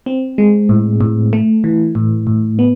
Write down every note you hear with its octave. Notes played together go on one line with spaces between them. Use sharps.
C4
G#3
A2
A2
A3
E3
A2
A2
B3